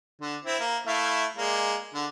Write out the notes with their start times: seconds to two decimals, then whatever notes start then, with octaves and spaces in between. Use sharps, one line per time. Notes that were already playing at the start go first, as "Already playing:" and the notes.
0.21 D3
0.45 C4 E4
0.60 A#3
0.87 A3 E4 F5
1.37 G#3 A#3 D5
1.94 D3